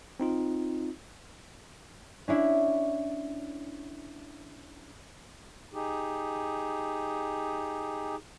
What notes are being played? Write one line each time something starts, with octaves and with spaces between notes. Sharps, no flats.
C4 D#4 F4
C#4 D4 E4
D#4 G4 G#4